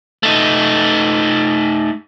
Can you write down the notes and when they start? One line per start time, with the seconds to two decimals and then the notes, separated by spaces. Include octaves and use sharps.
0.23 A3 D#4